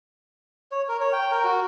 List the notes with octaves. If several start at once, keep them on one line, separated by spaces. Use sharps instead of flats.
C#5
A#4
C#5
G5
A#4
F#4